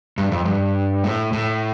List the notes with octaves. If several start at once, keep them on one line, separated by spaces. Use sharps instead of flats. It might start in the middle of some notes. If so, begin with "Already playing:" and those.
G2
F2
G2
A2
A2